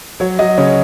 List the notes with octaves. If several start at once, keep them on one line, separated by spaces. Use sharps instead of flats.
F#3 C#5
F#3 D#5
C#3 C#5